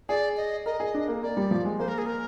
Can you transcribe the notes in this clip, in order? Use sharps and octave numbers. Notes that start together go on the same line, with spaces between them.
G#4 D5
D#5
A#4 D#5
G#4
D4
A#3
A#3 D5
G3
F3
G#3
A#3 C5
A#4
G#4
A#4